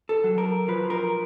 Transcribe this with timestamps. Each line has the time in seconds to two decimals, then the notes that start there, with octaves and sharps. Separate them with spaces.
0.09 A4
0.24 F#3
0.38 A#4
0.68 F3 B4
0.90 A#4